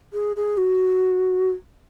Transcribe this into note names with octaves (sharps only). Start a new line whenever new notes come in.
G#4
G#4
F#4